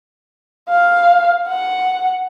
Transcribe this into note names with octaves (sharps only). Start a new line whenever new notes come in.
F5
F#5